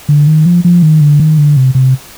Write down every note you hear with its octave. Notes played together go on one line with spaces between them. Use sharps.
D3
D#3
F3
F3
D#3
D3
D#3
D3
C3
C3